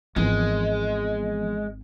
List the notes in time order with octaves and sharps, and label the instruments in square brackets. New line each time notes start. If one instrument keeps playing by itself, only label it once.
[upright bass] G#1 [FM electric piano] E3 F3 B3 [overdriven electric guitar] G#3